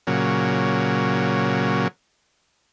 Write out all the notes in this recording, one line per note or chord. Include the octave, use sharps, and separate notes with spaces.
A#2 C#3 F#3